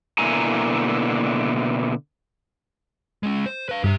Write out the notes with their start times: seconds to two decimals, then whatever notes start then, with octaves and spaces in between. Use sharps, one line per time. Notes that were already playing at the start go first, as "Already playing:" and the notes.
0.18 B2 D3 A#3 E4 G#5 A#5
3.23 G#3 C#4
3.46 C5
3.69 B4 F5
3.84 G2 G4 E5